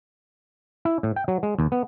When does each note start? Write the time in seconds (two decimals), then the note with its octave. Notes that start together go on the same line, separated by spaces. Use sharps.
0.85 E4
1.03 A2
1.16 G5
1.28 F#3
1.43 G#3
1.59 D#2
1.72 B3